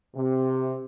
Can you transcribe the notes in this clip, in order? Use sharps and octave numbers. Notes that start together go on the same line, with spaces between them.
C3